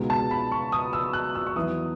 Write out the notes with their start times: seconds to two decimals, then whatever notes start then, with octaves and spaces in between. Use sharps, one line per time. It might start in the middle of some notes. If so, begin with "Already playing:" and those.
Already playing: C#2 B2 G#3 B3 D#4
0.10 A5
0.31 B5
0.52 C#6
0.72 D#6
0.93 E6
1.13 F#6
1.35 E6
1.47 C#6
1.55 E2 D#3 F#3 B3 E4 D#6